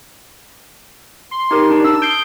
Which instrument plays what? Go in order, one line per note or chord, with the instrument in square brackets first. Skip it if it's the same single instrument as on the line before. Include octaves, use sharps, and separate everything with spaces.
[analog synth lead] C6
[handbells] D#4 G4 A#4
[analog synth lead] D4 [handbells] A5
[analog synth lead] E6
[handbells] D#6 C7 D7 [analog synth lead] G6